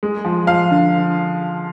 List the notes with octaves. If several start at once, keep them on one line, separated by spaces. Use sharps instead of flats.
G#3
F3
F3 F5
D3